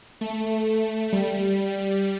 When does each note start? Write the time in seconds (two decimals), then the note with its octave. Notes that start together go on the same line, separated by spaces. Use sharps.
0.21 A3
1.13 G3